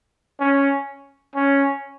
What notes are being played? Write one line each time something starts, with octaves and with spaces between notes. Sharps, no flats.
C#4
C#4